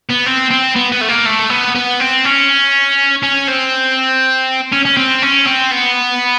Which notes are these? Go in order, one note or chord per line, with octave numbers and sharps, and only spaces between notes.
B3
C4
C4
B3
B3
A3
A#3
A3
B3
B3
C4
C#4
C#4
C4
C#4
C#4
C4
C#4
C4
B3